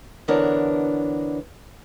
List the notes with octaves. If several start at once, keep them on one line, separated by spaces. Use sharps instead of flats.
D3 E3 B3 D4 A#4 C#5